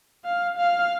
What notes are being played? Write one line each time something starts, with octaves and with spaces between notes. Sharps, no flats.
F5
F5